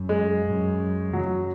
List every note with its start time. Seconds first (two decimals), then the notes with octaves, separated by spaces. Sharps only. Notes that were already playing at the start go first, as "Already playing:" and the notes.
Already playing: F#2
0.09 G#3
0.45 F#2
1.13 F#2 F#3